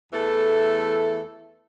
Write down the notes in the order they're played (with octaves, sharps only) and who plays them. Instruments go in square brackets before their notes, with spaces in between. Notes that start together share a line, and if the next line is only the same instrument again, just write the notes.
[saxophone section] E2 E3 A3 A4